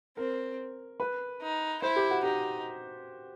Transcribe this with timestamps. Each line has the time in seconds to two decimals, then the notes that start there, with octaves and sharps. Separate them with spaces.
0.17 C4 A#4
1.00 B4
1.41 D#4
1.82 E4 C5
1.96 G4
2.11 F#4
2.24 D#4 G4